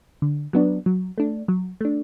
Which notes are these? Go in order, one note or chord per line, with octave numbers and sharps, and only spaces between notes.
D3
F#3 B3 D4
F#3
A3 D4
F#3
A3 D4